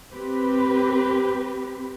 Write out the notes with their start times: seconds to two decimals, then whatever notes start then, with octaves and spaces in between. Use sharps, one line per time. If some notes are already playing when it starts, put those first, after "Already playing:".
0.12 C4 G4 B4